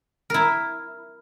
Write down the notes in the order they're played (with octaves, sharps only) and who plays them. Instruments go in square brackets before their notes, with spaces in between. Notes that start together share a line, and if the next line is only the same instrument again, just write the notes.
[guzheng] E4 A#4